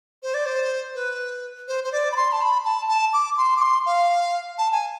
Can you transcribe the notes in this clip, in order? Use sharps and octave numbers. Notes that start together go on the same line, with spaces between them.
C5
D5
C5
B4
C5
C5
D5
B5
C6
A5
B5
A5
A5
D6
C6
D6
C6
F5
A5
G#5